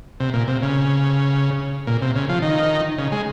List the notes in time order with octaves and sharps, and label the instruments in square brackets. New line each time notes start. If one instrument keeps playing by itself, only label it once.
[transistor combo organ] C3
A#2
C3
C#3
A#2
C3
C#3
F3
D#3
C#3
G#3